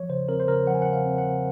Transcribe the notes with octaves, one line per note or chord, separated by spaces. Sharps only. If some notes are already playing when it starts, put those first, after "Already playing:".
Already playing: F3 C#5
C#3 C5
C4 A#4
C5
C#3 A#4
F3 F#5
G#5
C#3 F#5
F5
C4
F#5
C#3